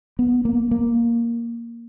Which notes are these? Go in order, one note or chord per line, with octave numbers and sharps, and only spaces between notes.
B3
A#3
A#3